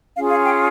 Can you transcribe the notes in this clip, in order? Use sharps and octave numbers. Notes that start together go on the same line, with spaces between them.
C#4 F4 G#4 F5
F5
G5